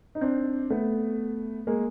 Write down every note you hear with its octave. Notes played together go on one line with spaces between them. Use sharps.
D#4
C4 D4
A3 B3
G#3 A#3